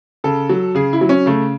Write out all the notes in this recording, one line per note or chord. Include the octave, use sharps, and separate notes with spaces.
C#3 A4
F#3
C#3 G#4
E4
F#3
C#4
C#3 A3